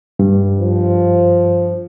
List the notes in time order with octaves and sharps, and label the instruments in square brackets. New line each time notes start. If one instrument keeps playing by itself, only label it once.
[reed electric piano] G2
[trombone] F3